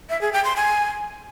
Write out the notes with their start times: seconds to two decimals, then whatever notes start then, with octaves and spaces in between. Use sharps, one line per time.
0.10 E5
0.21 G#4
0.33 G5
0.45 C6
0.56 G#5